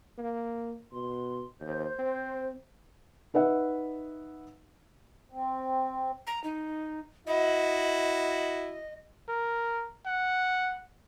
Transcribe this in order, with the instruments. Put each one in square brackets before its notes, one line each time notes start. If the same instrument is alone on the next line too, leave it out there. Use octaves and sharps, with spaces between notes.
[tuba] A#3
[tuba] B2 [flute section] C6
[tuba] D#2 [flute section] C5 G6
[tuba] C4
[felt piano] D#4 B4 E5 F#5
[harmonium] C4
[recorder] A#5
D#4
[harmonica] E4 F#4 [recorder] D#5
[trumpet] A#4
F#5